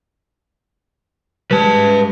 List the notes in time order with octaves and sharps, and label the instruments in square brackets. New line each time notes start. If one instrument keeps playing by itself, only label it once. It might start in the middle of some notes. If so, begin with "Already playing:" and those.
[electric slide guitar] G3 G#3 [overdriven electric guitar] B4 A5